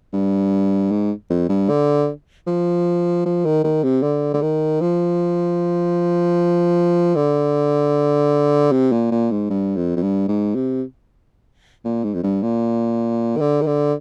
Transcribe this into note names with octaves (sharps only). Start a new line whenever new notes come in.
G2
G#2
F2
G2
D3
F3
F3
D#3
D#3
C3
D3
D3
D#3
F3
D3
C3
A#2
A#2
G#2
G2
F2
F2
G2
G#2
C3
A#2
G#2
F2
G2
A#2
D#3
D3
D#3
D3